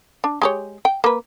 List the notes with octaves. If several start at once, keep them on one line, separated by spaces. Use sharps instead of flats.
D4
G#3 G4 C#5
G5
A#3 B4